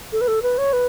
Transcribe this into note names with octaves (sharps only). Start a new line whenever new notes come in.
A4
B4
A4
B4
C#5
B4